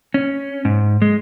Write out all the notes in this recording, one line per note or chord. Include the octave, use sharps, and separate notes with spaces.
C#4
G#2
G#3